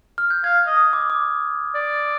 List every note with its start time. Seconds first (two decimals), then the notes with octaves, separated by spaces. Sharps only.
0.18 F6
0.31 G6
0.44 F5 G#6
0.67 D#5
0.77 D#6
0.93 D6
1.10 D6
1.75 D5